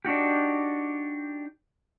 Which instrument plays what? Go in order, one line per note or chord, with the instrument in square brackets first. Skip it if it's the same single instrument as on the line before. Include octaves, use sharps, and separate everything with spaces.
[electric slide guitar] D4 D#4 F#4 G4